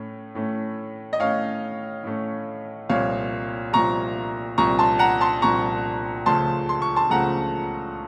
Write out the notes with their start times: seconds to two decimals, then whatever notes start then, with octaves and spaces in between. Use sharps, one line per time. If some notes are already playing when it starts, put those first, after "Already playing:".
Already playing: A2 A3 C#4
0.35 A2 A3 C#4
1.13 D#5
1.19 A2 A3 C#4 C#5 F5
2.04 A2 A3 C#4
2.89 C2 A#2 F3 C#5 F5
3.73 C2 A#2 F3 A#5 C#6
4.58 C2 A#2 F3 A#5 C#6
4.79 A5 C6
4.99 F#5 A#5
5.21 A5 C6
5.42 C2 A#2 F3 A#5 C#6
6.26 C#2 C#3 F3 A3 A5 C6
6.69 C6
6.82 C#6
6.96 A5 C6
7.10 C#2 C#3 F3 A3 F#5 A#5